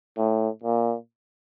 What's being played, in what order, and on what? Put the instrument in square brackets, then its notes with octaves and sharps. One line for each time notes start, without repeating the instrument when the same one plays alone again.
[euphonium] A2
A#2